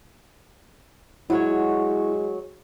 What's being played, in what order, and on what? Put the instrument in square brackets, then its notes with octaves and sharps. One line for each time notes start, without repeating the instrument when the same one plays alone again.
[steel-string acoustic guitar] F#3 F#4 C#5 [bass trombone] G#3 [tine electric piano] E4